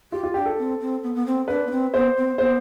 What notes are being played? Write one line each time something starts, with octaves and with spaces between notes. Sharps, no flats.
F4 G4
F4
D4 G4
A4
C4
C4
B3
B3
C4
D4 B4
B3
C4
B3 C5
C4
B3 C5